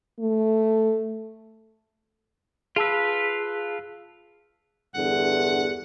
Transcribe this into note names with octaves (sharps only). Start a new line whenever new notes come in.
A3
F4 G#4 B4 A5 E6
E2 G2 D3 F#5